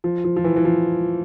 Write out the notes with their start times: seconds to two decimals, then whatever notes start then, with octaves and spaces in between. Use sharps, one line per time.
0.04 F3
0.24 F3
0.36 F3
0.44 E3
0.56 E3
0.65 F3